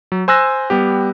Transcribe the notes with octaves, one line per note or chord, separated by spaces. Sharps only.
F#3
C5 G#5 E6 F#6 A#6
G3 B3 G4